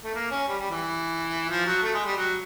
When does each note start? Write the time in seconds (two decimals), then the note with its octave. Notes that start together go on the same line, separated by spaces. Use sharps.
0.04 A3
0.15 A#3
0.31 C#4
0.48 G3
0.59 G3
0.71 E3
1.49 F3
1.66 F#3
1.83 A3
1.94 G#3
2.05 G3
2.16 F#3